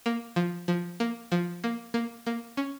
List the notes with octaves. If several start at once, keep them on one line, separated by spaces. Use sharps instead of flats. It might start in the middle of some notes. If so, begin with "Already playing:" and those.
A#3
F3
F3
A#3
F3
A#3
A#3
A#3
C#4